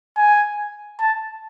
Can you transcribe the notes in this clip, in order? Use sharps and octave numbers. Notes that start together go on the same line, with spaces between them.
G#5
A5